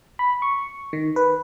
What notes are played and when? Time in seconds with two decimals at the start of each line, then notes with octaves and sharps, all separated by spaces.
0.19 B5
0.42 C#6
0.93 D#3
1.16 B4